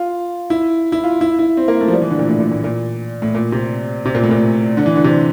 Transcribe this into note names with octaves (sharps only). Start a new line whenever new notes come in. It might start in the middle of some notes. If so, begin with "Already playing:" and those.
Already playing: F4
E4
E4
F4
E4
E4
C4
A#3
A3
F3
G3
E3
D3
A#2
A2
A#2
A2
A#2
A2
A#2
C3
C3
A#2
A2
A#2
D3
E3
D3
C3